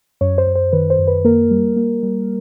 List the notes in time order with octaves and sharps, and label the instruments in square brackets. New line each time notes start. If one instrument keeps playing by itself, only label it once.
[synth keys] F#2 C#5
C5
F#2
C5
D#3 B4
C5
F#2
B4
A#3 A#4
G3
A#3
G3